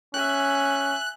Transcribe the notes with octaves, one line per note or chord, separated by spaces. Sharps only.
C#4 E5 G#5 F#6